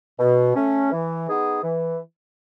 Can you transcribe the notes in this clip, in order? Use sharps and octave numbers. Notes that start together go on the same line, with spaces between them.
B2
A3 C#4
E3
B3 D#4 G#4
E3